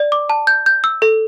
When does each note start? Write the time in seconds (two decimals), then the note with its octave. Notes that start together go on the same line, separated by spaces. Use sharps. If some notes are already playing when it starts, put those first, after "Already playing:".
Already playing: D5
0.12 D6
0.30 A5
0.47 G6
0.66 G6
0.84 E6
1.02 A4